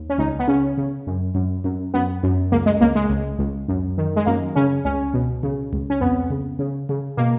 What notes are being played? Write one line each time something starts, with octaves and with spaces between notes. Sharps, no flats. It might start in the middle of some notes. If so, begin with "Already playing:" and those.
Already playing: D#2
C#4
C#2 D#4
B3
C#3 C#4
C#3
F#2
F#2
F#2
F#2 B3
F#2
C#2 A#3
G#3
C#2 A#3
G#3
C#2
C#2
F#2
D#3
G#3
F#2 A#3
C#3 C#4
C#2 C#4
B2
C#3
C#2
C#4
F2 B3
C#3
C#3
C#3
B2 A#3